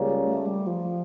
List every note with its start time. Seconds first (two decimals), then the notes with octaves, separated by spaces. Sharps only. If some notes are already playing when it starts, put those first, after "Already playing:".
Already playing: C#2 C#3 G3 A#3 C#4
0.24 A3
0.46 G3
0.67 F3